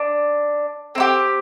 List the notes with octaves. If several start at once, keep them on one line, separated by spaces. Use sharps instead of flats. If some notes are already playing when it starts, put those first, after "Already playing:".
Already playing: D4
C4 E4 G4